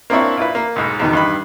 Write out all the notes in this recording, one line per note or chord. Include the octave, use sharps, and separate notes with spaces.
A#3 C4 D4 E4 C#5
A#2 E4 B4
A#3
B1 G#2 B5
E2 B2 D#3
G2 D#4 B5